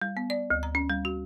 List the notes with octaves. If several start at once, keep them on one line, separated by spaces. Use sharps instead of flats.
G3
B3
D5
D2
A#5
C#4
G3
F#4